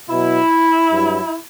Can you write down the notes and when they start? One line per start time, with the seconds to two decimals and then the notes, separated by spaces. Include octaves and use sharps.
0.11 B2 F#3 E4
0.92 G2 F#3